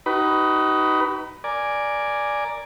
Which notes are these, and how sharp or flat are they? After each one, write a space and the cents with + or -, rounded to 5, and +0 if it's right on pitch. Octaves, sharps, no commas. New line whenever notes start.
D#4 +10 F#4 +45 B4 +10
A#4 +5 D5 +0 G#5 +0